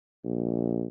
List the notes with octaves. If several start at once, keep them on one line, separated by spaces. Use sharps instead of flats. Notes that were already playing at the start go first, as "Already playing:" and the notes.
A#1